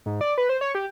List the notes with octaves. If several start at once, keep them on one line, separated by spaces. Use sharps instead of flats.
G#2
D5
B4
C5
C#5
G4